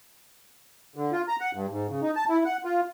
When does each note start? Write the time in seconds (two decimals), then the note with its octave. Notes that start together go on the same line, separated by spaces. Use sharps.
0.96 D3
1.12 F4
1.28 A#5
1.41 F#5
1.54 G2
1.70 G#2
1.89 C#3
2.02 D#4
2.16 A5
2.29 E4
2.45 F#5
2.64 F4